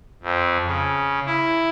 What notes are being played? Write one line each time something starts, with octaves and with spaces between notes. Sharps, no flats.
F2
C#3
E4